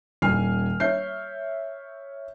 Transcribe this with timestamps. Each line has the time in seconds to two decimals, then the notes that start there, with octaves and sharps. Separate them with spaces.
0.22 D#1 G#5 F6 C7
0.80 C#5 E5 G6 C7